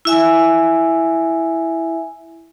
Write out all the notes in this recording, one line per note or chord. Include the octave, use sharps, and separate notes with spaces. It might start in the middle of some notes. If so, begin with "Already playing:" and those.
E4 E5 G#5